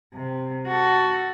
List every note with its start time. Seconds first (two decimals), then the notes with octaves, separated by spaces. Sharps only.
0.14 C3
0.67 F#4 A4